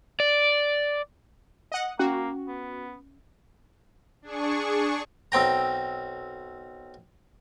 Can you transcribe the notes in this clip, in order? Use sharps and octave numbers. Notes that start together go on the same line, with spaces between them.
D5
D#5 F#5
A#3 C#4 F#4
B3
D4 G#4 C#6
B1 C4 G5 A#5